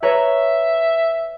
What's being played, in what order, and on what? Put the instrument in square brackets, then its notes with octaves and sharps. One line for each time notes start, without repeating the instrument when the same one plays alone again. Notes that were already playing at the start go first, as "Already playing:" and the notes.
[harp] B4 C#5 A#5 [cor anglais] E5